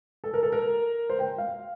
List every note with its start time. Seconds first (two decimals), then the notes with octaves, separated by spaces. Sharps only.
0.24 A4
0.34 A#4
0.43 A4
0.52 A#4
1.10 C5
1.19 G5
1.38 F5